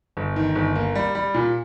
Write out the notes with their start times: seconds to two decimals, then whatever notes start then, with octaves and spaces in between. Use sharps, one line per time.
0.17 G1
0.36 D#3
0.55 G1
0.76 A#3
0.95 G3
1.15 G3
1.34 A#2